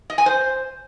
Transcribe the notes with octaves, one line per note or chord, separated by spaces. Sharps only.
D#5
G#5
C5